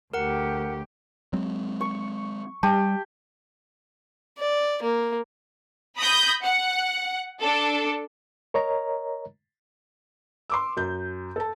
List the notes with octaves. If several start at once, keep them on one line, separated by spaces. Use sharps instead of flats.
D2 G4 A#4 F#5
F#3 G#3 C4
C#6
G3 G4 A5
D5
A#3
B5 D#6 G6 A#6
F#5
D4 A4
A#4 C#5 D#5 A#5
C6 D6 E6
F#2 G6
A4 A5